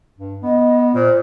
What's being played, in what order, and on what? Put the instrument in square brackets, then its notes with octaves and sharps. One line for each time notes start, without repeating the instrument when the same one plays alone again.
[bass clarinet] G2
[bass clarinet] B3 [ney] D#5
[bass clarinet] A#2 [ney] C5